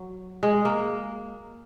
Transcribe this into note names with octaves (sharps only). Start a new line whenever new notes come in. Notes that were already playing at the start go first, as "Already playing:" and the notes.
Already playing: F#3
G#3
A#3